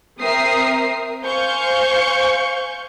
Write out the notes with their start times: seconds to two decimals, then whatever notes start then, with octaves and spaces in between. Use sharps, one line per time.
0.19 C4 A#4 E5 D#6 C7
1.23 C5 F5 G#5 C#6 G6